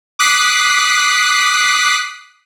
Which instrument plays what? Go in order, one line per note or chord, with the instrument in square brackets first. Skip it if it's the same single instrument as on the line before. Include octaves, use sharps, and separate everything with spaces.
[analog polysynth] D6 D#6 F#6 B6 C7